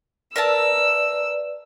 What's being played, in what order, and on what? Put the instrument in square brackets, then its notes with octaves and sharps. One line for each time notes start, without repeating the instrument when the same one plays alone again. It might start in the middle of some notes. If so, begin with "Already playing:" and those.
[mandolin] A#4 E5 A5 [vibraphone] B4 D5 [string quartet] E6